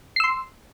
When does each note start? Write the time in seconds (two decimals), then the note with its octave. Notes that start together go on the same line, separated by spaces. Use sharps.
0.16 C7
0.20 E6
0.24 C6